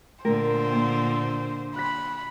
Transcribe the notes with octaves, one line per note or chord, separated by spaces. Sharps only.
A#2 D3 A3 A#4 C5
A#3
B5 F#6 B6